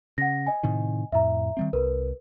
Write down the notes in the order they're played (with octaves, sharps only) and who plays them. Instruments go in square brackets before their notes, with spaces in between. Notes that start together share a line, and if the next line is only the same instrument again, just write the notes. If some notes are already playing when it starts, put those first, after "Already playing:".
[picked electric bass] C#3 [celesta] F#5 A#6
[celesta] D#5 G#5
[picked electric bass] A2 C3 D#3
[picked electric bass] F2 A2 [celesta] E5 A#5
[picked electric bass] D#3 G3 C4
[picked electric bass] C2 [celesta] A#4 B4